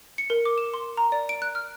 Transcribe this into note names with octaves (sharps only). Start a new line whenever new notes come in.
C#7
A#4
D6
E7
C6
A#5
D5
D7
F#6
F6